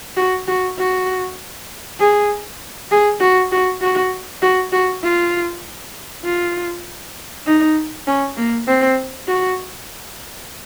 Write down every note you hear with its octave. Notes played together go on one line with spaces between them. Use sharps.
F#4
F#4
F#4
G#4
G#4
F#4
F#4
F#4
F#4
F#4
F4
F4
D#4
C#4
A#3
C4
F#4